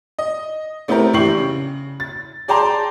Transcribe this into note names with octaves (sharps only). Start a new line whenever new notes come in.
D#5
A3 B3 C4 E4 G4 A#4
A#1 E3 G4 C#6 C7 F#7
C#3
A6
G#4 D5 G5 A5 A#5 C6